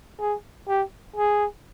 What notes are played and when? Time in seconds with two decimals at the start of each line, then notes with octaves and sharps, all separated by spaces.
0.20 G#4
0.68 G4
1.17 G#4